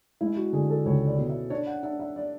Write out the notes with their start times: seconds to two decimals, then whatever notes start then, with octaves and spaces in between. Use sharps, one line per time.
0.21 G#3 E4
0.36 F#4
0.53 D3 G#4
0.70 A4
0.85 C#2 C#5
1.07 D5
1.18 B2
1.29 E5
1.50 D4 C#5
1.66 F#5
1.83 D4 E5
1.99 E5
2.16 D5